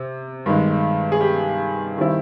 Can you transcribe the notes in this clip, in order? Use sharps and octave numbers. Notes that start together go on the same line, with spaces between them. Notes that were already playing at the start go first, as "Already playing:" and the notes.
Already playing: C3
G2 D#3 G#3
G#4
G4
D#3 G3 C4 E4